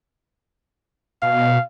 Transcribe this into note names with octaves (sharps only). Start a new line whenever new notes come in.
B2 F5